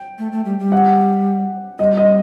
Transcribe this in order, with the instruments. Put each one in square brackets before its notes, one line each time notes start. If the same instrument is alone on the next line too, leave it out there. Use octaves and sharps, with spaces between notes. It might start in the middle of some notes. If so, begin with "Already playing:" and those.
Already playing: [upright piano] G5
[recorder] A3
A3
G3
G3
[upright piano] F#5
[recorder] G3 [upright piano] D#5
[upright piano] D#5